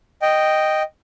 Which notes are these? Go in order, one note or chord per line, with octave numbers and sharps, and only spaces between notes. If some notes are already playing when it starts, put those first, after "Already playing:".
D#5 G5